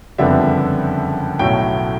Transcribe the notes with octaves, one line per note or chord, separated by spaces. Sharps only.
F#1 F2 D3 G3 B3 E5
B1 A2 F#3 A3 G5